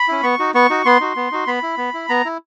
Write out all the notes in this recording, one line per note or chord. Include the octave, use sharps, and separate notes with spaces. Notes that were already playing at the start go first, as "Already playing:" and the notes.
Already playing: B5
C#4 E4
B3 C#6
D#4 F#4
B3 C#6
D#4 F#4
B3 C6
D#4 F#4
B3
D#4 F#4
B3 B5
E4
B3
E4
B3 A#5
E4